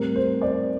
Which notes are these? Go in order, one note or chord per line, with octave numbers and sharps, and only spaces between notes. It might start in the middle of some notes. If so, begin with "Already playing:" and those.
Already playing: A2 G3 C4 A#4
C5
D5